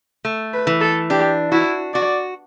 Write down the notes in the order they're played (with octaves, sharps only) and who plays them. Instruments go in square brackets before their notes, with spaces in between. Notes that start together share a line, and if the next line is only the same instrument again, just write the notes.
[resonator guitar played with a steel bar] A3
[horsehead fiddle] B4
[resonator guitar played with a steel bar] E3
[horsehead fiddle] A4
[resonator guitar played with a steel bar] D4 [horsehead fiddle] G4
[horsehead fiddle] E4 [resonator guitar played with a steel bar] F#4
[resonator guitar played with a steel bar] F#4 [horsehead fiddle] D5